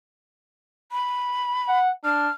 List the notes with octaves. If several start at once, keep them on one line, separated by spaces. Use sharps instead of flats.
B5
F#5
D4 F6